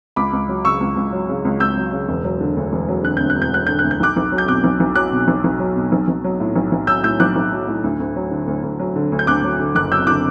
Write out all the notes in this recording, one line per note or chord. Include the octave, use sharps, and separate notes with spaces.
C#2 B5 D6
C#2
F#3
C#3 C#6 E6
C#2
C#2
F#3
C#3
C#2
C#2 E6 G6
F#3
C#3
E1
F#3
D3
D2
E1
F#3
D3 F#6
D2 G6
F#6
E1
G6
F#3 F#6
D3 G6
F#6
D2
G6
B1 D6 F#6
B1
F#3
G6
B2 D6 F#6
B1
B1
F#3 D6 F#6
B2
B1
B1
F#3
B2
B1
B1
F#3
A2
B1
B1
F#3 E6 G6
A2 E6 G6
B1 D6 F#6
B1
F#3
A2
D2
D2
F#3
D3
D2
D2
F#3
D3
D2
G6
D2 D6 F#6
F#3
D3
F#1 D6 F#6
F#3 E6 G6
D3 D6 F#6